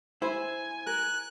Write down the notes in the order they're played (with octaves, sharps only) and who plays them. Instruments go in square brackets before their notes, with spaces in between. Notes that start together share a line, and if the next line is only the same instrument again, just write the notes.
[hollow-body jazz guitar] E4 [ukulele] C5 [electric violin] G#5
[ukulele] A#4 [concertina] F#6